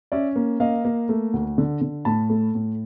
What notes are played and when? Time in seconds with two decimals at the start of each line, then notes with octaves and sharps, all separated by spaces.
0.12 C#4 D5 E5
0.36 A#3
0.60 A#3 D#5 F5
0.85 A#3
1.09 A3
1.33 D2
1.58 D3
1.81 D3
2.05 A2 A5 B5
2.30 A3
2.55 A2